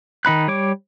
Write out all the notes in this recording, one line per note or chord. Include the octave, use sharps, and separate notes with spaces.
D#3 D#4 B5 F#6
G3 C#5 D6